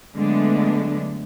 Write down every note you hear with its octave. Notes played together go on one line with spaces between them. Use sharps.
D3 F#3 G#3 A3 B3 D4